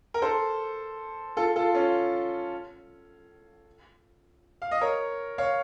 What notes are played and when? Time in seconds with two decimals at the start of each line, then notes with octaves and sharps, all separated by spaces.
0.14 A#4
0.22 A4 C5
1.37 F4 A4
1.56 F4 A4
1.75 C#4 F4
4.62 F5
4.71 D#5
4.81 A#4 C#5
5.38 C#5 F5